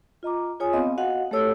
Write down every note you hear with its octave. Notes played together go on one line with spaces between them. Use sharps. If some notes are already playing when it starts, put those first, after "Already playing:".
F4 D#5 A#5 D6
F4 G#4 C#5 G#5 D#6
B3 C4 D#5 F5
F#4 D#5 F5 F#5
A3 G4 A4 C#5 E6